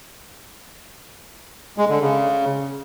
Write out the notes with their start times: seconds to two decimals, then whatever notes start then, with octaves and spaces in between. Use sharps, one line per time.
1.78 G#3
1.89 D3
2.01 C#3